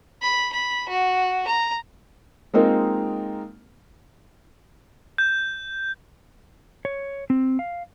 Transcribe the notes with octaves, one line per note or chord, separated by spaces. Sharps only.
B5
B5
F#4
A#5
G#3 A#3 C4 D#4 F4 A#4
G6
C#5
C4
F5